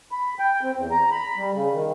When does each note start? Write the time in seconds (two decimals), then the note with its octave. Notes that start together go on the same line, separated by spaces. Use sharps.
0.12 B5
0.39 G5
0.63 C4
0.77 E2
0.91 A#5
1.12 B5
1.37 G3
1.54 C#3
1.73 D#3